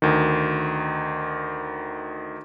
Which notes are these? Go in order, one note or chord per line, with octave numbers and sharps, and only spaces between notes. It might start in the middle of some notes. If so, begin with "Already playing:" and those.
D2 D#3